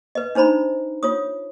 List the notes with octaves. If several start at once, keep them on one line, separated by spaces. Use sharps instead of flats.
B4 D#5
D4 D#4 C5 A#5 B5
F4 C#5 D#6